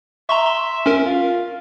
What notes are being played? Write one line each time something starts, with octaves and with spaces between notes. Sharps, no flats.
E5 A#5 C6 C#6
C6
C#4 A#4
F4